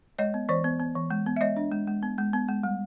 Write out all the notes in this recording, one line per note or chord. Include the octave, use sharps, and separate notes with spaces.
G#3 C#5 D#5
B3
E3 C5 D5
B3
B3
E3
G#3
B3
E5
G#3 C#5 D#5
D4
G#3
G#3
B3
G#3
B3
G#3
G3